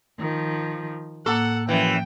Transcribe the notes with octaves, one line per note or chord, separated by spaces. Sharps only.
D#3 F3
A2 A#3 A4 F#5 D6
F#2 E3 F3 G5